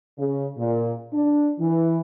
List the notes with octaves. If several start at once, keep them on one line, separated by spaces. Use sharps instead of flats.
C#3
A#2
D4
E3